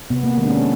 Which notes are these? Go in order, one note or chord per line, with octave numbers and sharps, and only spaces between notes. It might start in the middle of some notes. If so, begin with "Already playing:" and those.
C3 B3
A#3
D#3 G#3 B3
D4
C#4